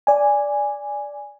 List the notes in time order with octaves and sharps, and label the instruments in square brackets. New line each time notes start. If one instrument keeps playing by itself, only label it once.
[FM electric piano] D5 G#5